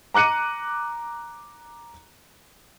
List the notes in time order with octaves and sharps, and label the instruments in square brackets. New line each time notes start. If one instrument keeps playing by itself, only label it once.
[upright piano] A#5 D6 F#6 C#7 D#7